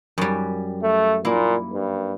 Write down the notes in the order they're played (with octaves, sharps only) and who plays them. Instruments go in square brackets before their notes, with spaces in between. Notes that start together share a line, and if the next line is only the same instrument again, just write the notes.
[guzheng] F#2 G3
[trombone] A3
[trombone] A#2 [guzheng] A#3 E4
[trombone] G2